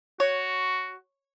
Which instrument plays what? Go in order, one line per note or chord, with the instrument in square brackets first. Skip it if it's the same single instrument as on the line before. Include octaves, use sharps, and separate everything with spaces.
[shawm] F#4 [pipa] C#5